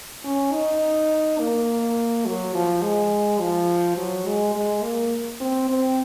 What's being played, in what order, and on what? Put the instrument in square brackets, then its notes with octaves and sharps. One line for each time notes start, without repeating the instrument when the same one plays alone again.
[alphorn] C#4
D#4
A#3
F#3
F3
G#3
F3
F#3
G#3
G#3
A#3
C4
C4